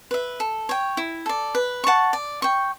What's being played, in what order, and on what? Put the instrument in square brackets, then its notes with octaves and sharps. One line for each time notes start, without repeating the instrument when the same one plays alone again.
[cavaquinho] B4 E5
A4
C#5 G5
E4
A4 D5
B4
F#5 A5 C#6
D5
G5 C#6